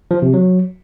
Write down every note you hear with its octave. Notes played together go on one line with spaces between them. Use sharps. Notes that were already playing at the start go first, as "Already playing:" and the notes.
F3
C3
F#3